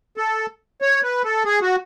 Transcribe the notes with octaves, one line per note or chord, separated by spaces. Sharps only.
A4
C#5
B4
A4
G#4
F#4